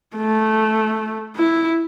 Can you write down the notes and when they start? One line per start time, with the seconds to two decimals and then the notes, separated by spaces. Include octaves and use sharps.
0.16 A3
1.36 E4